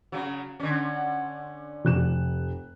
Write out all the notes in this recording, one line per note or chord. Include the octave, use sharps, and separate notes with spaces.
C#3 F#3
D3 C#4
F1 F#6 E7